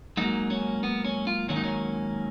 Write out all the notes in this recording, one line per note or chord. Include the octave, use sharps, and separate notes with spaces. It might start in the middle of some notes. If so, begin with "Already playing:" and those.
G#2 F#3 A#3 D#4
C#4
B3
C#4
F4
G#2 D#3 F#3 A#3 C#4
D#4
C#4